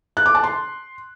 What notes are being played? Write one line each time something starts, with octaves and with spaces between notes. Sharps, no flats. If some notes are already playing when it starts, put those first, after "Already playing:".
F#6
D6
A5
C6